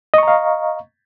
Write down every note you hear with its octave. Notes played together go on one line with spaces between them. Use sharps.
D#5 F5 A#5 C#6